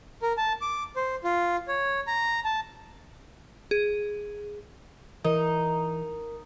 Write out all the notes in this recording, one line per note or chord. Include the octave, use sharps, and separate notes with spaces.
A#4
A5
D6
C5
F4
C#5
A#5
A5
G#4
E3 D#4 A#4